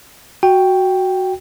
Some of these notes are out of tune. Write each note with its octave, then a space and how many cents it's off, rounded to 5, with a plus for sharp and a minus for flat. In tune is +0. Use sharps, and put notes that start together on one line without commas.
F#4 +0 G5 +0